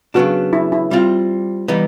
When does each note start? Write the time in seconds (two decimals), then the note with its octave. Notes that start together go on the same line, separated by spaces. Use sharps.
0.14 C#3 F#3 B3 D4 F#4
0.53 E4
0.72 E4
0.91 G3 C4 F4
1.68 E3 G3 B3 D#4